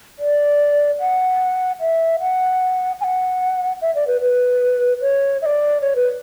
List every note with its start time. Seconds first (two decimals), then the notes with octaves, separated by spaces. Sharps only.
0.19 D5
1.00 F#5
1.80 E5
2.20 F#5
3.01 G#5
3.04 F#5
3.81 E5
3.95 D5
4.07 B4
4.21 B4
5.01 C#5
5.42 E5
5.46 D5
5.82 C#5
5.96 B4